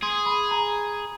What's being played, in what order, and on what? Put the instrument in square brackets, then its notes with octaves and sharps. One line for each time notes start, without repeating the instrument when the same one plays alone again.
[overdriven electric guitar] G#4 [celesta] C6
[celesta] B5
A#5